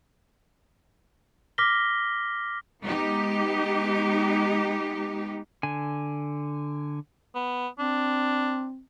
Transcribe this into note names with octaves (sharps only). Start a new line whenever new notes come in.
D6 F6 A#6 B6 G7
G#3 B3 D#4 G4
D3 G#5
B3
C4 D4